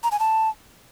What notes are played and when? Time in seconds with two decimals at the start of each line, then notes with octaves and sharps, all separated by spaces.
0.03 A#5
0.12 G#5
0.20 A5